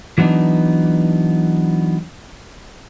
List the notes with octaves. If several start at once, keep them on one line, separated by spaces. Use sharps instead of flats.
E3 F#3 B3 D4 D#4